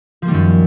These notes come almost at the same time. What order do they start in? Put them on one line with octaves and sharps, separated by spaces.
F3 A#3 G3 D#3 F#2